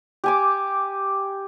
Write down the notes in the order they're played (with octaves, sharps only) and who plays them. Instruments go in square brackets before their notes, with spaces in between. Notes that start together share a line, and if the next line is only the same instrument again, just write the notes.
[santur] G4 G#5 D6